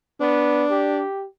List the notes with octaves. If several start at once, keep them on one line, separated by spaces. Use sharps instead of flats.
B3 D4
G4